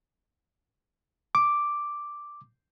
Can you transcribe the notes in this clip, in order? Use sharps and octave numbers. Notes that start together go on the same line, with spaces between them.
D6